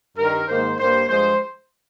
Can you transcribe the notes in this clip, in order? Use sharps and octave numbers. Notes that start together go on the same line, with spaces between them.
G2 D#3 G3 A#4
G#2 D#3 A#3 C5
G2 G3 A#3 C5
G2 F3 G#3 C5